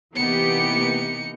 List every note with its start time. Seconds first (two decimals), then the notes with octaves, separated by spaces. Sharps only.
0.16 C3 E3 A#3 B3 D#4 G4 C#7